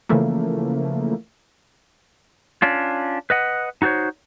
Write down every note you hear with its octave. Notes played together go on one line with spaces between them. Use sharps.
C#3 E3 F3 A3 A#3
C#4 D4 F4
B4 D#5 F#5
D#4 F#4 A4 C5 C#5